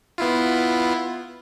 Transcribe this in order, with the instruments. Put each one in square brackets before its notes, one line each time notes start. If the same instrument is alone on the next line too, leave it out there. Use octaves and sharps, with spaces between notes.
[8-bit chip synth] B3 E4 F4